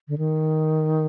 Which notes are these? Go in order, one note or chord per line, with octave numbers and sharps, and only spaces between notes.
D3
D#3